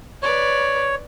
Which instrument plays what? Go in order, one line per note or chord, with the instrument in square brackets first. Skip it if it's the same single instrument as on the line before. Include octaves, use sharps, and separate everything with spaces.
[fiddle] B4 D5 [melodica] C#5